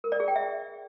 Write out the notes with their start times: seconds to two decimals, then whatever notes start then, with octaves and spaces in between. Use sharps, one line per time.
0.04 A#4
0.12 D5
0.20 G#4
0.28 G5
0.36 E5